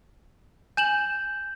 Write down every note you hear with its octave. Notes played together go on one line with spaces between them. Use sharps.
G#5 G6 E7 F#7